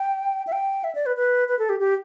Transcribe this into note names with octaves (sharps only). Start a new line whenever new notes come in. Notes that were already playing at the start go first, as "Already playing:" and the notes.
Already playing: G5
E5
G5
E5
D5
B4
B4
B4
A4
G4
G4